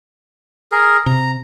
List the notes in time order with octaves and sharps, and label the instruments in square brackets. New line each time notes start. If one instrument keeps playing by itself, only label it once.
[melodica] G#4 A#4
[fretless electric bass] C3 [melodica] A#5